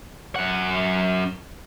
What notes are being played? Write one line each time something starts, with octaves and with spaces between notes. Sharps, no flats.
F#2 F#5